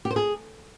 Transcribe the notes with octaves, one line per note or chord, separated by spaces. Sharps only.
G4
C5
G#4